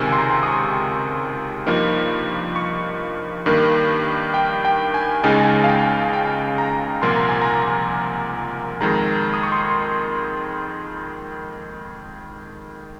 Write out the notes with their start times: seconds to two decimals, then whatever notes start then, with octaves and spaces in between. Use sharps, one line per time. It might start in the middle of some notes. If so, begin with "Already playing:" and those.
Already playing: C#2 C3 D#3 G#5
0.12 C6
0.18 A#5
0.43 D#6
0.48 C#6
1.67 G2 F3 A#3 D#4
2.56 C#6
3.46 G2 D#3 A#3
4.34 G5
4.65 G5
4.94 G#5
5.24 C#2 C#3 G#3 D#4 G#5
5.64 F5
5.69 G5
6.13 G5
6.58 A#5
7.02 C2 A#2 F3 A#3 C6
7.16 A#5
7.29 G#5
7.42 A#5
8.81 F2 D#3 G#3 A#5
9.34 D#6
9.43 C#6
9.52 C6